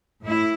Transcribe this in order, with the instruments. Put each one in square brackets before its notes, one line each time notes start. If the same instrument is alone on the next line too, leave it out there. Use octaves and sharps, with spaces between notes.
[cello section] A2 E4